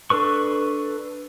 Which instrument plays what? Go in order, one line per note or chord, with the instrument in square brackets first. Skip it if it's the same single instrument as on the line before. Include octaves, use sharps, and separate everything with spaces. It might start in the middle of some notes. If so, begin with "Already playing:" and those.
[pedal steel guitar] D4 A4 B4 C#6